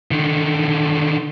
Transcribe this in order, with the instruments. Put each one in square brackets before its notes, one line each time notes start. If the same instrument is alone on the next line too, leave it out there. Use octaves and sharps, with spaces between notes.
[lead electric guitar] D3 D#3